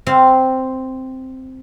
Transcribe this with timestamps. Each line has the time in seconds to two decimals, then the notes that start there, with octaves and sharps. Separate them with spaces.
0.07 C4 F5